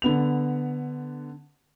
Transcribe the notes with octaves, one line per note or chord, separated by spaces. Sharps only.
D3 B3 F7